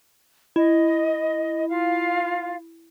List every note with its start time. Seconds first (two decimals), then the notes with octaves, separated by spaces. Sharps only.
0.56 E4 D#5
1.68 F4 F5